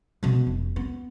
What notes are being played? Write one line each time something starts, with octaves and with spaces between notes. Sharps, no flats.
B2 B3
F1
B3